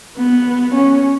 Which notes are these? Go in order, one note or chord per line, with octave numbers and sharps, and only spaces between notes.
B3
C#4